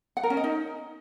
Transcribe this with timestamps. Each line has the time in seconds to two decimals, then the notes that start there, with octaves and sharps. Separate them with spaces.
0.17 F#5
0.23 A#4
0.30 C#4
0.37 D#5
0.44 D#4